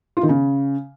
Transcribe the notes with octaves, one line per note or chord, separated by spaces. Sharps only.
F4
D#3
C#3